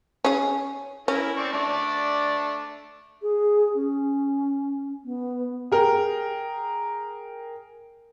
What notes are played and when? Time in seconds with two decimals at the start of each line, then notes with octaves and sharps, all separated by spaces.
0.25 C#4 G#4
1.08 C#4 E4 A#4
1.37 C4 D5 C#6
1.53 A3 D4 D5
3.22 G#4
3.75 C#4
5.05 B3
5.72 G#4 A#4 G5